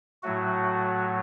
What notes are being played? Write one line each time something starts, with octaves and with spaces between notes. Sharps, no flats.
A2 F#3 A3 F#4